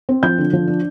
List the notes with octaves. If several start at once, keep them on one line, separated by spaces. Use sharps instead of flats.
C4
F3 G6
D3
F3
D4